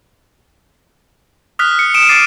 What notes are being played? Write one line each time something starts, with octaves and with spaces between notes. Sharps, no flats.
D#6 F6 F#6 B6
C#7
D#6 D7 E7
D6 A6 C7 D7 D#7